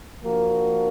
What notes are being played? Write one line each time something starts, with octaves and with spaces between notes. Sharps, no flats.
F3 A#3 D4 F#4 A#4